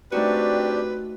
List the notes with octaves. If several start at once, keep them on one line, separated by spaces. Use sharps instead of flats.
A3 C4 D4 D#4 F#4 G4 B4 D5